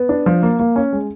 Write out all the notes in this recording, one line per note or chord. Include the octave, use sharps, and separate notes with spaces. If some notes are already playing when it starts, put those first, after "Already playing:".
Already playing: B3
D4
F3
A#3
A#3
C#4
G#3